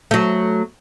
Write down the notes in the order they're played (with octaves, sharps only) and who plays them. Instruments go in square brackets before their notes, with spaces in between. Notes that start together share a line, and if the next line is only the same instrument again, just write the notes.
[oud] F#3 A3